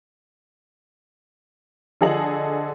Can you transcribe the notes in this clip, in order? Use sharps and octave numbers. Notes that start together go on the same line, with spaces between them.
D3 F3 G#4 A4 D#5 F#7